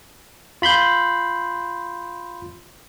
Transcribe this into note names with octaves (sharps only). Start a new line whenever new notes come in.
F4 B5 C6 G6